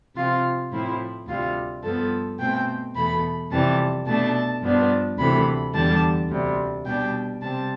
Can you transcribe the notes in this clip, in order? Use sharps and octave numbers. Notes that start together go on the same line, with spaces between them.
C3 F3 C4 F4
A2 F3 C4 E4
D2 C3 G3 F4
G2 F3 B3 A4
B2 A3 C4 G5
E2 B2 A3 B5
F2 C3 E3 G3 A5
B2 A3 D4 A5
G2 F3 B3 D4
D2 C3 E3 A3 B5
E2 D3 G3 D4 A5
D2 C3 G3
B2 G3 D4 G5
C3 G3 C4 A5